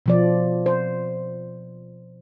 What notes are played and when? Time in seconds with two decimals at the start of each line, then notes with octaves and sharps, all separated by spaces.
0.06 B2 F3 D5
0.66 C5